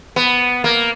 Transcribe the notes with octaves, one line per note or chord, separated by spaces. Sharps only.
B3
A#3